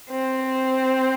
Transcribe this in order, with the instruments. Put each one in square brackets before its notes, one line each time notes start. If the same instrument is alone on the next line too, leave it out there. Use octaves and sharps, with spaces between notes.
[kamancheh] C4